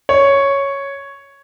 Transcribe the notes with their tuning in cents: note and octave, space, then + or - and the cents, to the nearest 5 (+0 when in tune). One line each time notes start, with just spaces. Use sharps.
C#5 +0